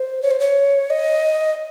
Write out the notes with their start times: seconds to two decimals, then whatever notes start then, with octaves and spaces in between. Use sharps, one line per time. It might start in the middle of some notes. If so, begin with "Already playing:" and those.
Already playing: C5
0.22 C#5
0.31 C5
0.40 C#5
0.90 D#5